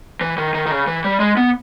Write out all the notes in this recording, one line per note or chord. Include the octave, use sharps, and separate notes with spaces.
E3
D#3
D#3
D#3
C#3
E3
G3
G#3
B3